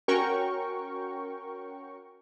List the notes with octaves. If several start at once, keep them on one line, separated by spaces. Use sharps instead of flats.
C#4 F#4 A#4 G5 C#6